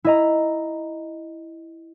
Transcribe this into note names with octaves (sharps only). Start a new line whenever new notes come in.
E4 D#5 A#5